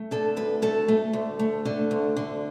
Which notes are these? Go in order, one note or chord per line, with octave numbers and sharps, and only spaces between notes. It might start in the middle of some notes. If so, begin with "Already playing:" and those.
Already playing: A3
D3 A4
D2 B4
A3 A4
A3
D2
A3
D3
D2
D3